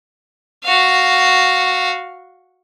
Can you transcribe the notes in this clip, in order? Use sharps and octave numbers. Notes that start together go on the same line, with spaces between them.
F#4 F5